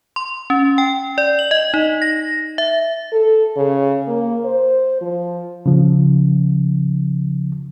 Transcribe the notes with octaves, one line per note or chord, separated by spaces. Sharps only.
C6
C#4
G5
D5
F#7
D#5
D#4
A#6
E5
A4
C#3
A#3
C5
F3
C#3 F3